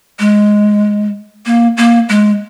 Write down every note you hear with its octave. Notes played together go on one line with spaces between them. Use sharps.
G#3
A#3
A#3
G#3